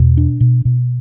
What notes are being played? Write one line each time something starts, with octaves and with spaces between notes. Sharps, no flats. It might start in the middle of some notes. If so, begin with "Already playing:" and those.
Already playing: E2 B2
D4
B2
B2